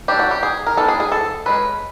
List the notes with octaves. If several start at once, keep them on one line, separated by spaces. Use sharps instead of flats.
F#3 A3 D4 G4
F#4
G4
G#4
A#4
E3 G3 B3 D4 A4
G#4
G#4
A4
G#3 C#4 B4